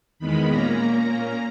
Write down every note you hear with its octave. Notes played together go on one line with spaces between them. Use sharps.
E2 D#3 G#3 B3 B5
A#2 A#3 C#4 A#5
A#2 A#3 C#4
A#2 A#3 C#4